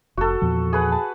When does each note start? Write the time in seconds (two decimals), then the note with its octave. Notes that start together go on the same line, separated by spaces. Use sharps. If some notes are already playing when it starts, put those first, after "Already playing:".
0.17 F1 F#4 A4
0.42 E2 A#2 F3
0.73 G#4 B4 F#5
0.92 A5